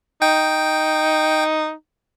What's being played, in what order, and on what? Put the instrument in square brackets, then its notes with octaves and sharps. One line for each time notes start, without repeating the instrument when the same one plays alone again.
[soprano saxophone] D#4 [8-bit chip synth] G5